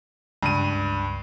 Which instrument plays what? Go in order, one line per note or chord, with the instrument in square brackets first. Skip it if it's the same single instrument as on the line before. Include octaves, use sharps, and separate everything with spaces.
[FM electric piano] C#2 [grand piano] G2 D#7